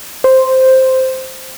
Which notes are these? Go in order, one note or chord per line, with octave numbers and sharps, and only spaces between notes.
C5